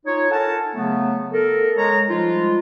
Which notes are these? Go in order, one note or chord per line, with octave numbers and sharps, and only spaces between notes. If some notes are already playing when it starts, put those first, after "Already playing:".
D#4 F4 C#5
A4 A#4 F#5 G#5 A5
C#3 F#3 A3 B3
A4 A#4
G#3 C#5 A#5
F3 G3 G#3 D#4 F4